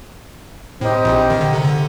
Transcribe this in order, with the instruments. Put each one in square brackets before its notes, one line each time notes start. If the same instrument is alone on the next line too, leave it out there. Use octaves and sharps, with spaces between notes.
[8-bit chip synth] A2 [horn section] G3 C4 D#4 G4
[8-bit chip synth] A#1 A#2
D#3
D3
C3
D3